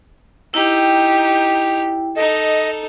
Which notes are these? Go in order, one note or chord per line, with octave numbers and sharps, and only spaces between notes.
D#4 E4 G4 G5
D#4 A4 D#5